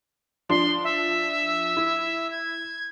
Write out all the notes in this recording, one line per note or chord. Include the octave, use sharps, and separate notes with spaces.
F3 D4 C6
E5
E4
G#6